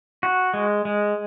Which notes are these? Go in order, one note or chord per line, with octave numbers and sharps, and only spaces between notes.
F#4
G#3
G#3